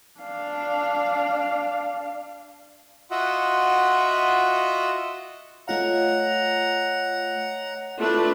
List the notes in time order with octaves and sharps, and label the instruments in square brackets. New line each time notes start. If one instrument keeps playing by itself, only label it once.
[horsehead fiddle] D4 F5
[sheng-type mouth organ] F4 F#4 D#5 E5 F#5
[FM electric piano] A3 F4 F5 [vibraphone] C#5 D#5 [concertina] F#5 A#5
[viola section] A3 D4 B4 [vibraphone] E4 F4 C6